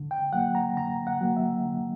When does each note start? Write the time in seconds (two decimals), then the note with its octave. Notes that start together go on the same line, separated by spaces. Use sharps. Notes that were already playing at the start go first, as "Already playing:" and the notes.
Already playing: D3
0.11 G5
0.33 F#3 A#3 F#5
0.55 A#5
0.77 D3 A#5
1.07 F#5
1.21 F#3 A#3
1.36 E5
1.65 D3